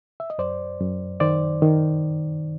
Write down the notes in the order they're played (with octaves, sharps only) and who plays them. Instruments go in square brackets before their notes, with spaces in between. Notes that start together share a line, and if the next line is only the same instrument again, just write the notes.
[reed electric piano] E5
D#5
F#2 C5 D5
F#2
D#3 C5 D5
D#3